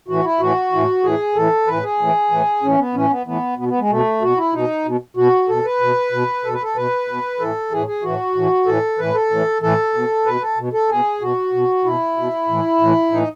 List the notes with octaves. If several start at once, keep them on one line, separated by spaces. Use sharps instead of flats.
A2 E3 F#4
E4
A2 E3 F#4
A2 E3
A2 E3 G#4
A2 E3 A4
A2 E3 B4
G#4
A2 E3
A2 E3
A2 E3 C#4
B3
A2 E3 C#4
B3
A2 E3 B3
B2 B3
B3
G#3
B2 A3
B2 F#4
E4
B2 D#4
B2
B2 F#4
B2 A4
B4
B2
B2
B2 A4
B4
A4
B2 B4
B2
A2 E3 A4
A2 E3 G#4
G#4
A2 E3 F#4
A2 E3
A2 E3 A4
A2 E3 B4
A4
A2 E3
A2 E3 A4
B2
B2 B4
A4
B2
A4
B2 G#4
B2 F#4
B2
B2 E4
B2
A2 E3
A2 E3
A2 E3 D#4